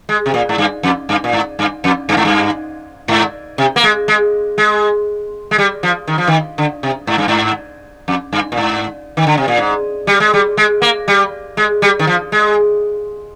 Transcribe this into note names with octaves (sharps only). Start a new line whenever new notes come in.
G#3
C3
A#2
G#2
G2
F2
G2
A#2
G#2
G2
F2
G2
G#2
G2
G#2
C3
A#3
G#3
G#3
G#3
G#3
G3
F3
D#3
F3
D#3
D3
C3
G#2
G2
G#2
F2
G2
A#2
G#2
D#3
D3
C3
A#2
G#2
G3
G#3
G3
G#3
A#3
G3
G#3
G3
D#3
F3
G#3